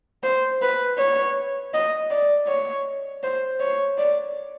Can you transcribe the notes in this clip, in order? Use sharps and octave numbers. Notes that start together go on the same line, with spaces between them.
C5
B4
C#5
D#5
D5
C#5
C5
C#5
D5